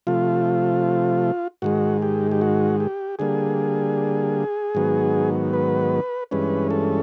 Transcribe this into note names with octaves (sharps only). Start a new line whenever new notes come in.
C3 F3 A3 F4
G#2 D#3 G#3 F#4
G4
G4
F#4
G4
D3 G3 A#3 G#4
G#2 D#3 F#3 B3
B4
G2 E3 G#3 C#4 B4
A4